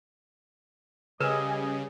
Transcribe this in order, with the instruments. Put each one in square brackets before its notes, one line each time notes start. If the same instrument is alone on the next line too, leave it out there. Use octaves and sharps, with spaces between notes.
[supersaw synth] C#3 [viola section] G3 D#5 G#5 [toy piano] A#4 B4